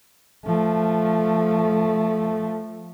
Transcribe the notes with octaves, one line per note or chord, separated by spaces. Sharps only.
F3 A3